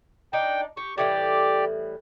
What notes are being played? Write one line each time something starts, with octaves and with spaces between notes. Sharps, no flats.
D4 D#4 D5 G5
G4 C#6
A2 E3 G3 G4 D5